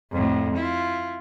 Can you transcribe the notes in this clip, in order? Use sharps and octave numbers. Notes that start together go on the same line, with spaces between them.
F2 A2
E4 F4